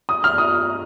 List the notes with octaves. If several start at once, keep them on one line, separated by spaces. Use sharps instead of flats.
D#6
F6
D#6